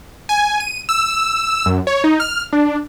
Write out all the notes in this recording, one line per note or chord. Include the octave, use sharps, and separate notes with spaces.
G#5
D#7
E6
F#2
C#5
D#4
F6
D4